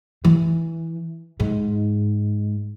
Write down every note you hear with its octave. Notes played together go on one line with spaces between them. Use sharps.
E3
G#2